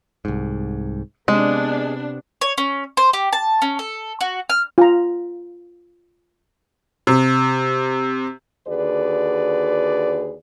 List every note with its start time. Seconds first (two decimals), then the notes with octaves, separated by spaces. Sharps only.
0.25 C2 G#2
1.28 C3 G#3 B3 D4
2.41 C#5
2.58 C#4
2.97 C5
3.13 G4
3.33 A5
3.62 C#4
3.79 A4
4.21 F#4
4.50 F6
4.78 F4 A#5
7.07 C3
8.67 D#2 D3 F#4 G#4 B4 D5